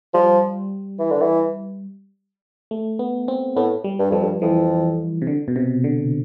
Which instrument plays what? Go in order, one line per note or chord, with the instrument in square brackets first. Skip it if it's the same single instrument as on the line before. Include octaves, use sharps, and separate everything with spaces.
[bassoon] F3 [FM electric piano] G3
[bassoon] E3
D3
E3
[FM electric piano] A3
B3
C4
[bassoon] A2 [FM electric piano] B3
[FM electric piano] G3
[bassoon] G2
[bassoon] F2 [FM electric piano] F3
[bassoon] G2
[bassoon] F2 [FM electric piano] E3
[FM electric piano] C3
D3
B2
C3
D3